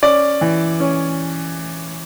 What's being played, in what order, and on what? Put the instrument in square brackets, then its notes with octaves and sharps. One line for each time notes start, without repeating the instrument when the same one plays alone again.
[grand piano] C#4 D5
E3
C#4